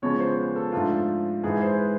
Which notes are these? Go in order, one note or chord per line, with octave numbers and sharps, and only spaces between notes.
E2 C#3 F3 G#3 C#5
C5
B4
A4
G#2 F3 A3 D4 F4 A4
G#2 E3 G#3 G#4
C5
B4